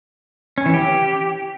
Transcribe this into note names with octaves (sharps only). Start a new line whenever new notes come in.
C#4
E3
G4